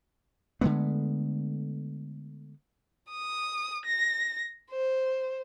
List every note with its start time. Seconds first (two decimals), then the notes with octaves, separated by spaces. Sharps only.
0.61 D3 G#3 A3 B3
3.11 D#6
3.85 A#6
4.71 C5